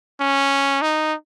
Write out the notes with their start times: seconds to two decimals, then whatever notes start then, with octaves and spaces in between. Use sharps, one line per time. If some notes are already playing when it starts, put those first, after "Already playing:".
0.21 C#4
0.82 D#4